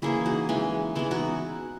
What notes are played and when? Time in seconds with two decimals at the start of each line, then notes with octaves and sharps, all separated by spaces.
0.02 E3 A#3 C#4 E4 G#4
0.26 D#4 F#4
0.49 E3 G#3 C#4
0.95 E3 G#3 B3 E4
1.11 D#4 F#4